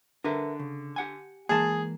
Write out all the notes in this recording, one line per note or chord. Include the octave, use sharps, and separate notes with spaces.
D3 A#4 B4 E5
C#3
G4 F#5 G#5
E3 G#3 A#3 G#4 A5